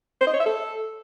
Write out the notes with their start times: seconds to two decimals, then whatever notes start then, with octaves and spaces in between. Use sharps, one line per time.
0.21 C5
0.27 D#5
0.33 C#5
0.40 E5
0.46 A4